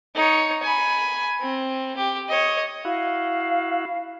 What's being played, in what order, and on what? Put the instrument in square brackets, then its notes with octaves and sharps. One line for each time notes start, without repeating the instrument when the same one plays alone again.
[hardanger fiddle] D#4 C#5
G#5 B5
C4
G4
C#5 D#5
[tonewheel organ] E4 F#4 [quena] F5